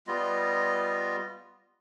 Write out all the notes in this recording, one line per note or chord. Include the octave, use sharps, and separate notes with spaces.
G3 B3 F4 D#5